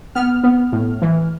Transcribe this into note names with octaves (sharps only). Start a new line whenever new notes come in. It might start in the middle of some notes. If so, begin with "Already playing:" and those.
B3 F6
B3
A2
E3